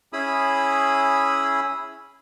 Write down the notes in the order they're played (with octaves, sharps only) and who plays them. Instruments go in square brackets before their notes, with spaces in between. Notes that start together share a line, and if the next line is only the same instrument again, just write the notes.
[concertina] C#4 E4 G#4 B5 D#6 E6